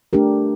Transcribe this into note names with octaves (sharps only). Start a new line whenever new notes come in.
A3 D4 G4 A#4